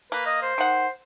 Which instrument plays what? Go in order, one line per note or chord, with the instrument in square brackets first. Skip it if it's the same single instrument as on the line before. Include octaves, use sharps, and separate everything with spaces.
[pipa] A#3 [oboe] B4
[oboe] D#5
C5
[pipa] D#3 F#5